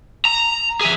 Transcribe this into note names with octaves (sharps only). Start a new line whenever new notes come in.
A#5
G#4 E5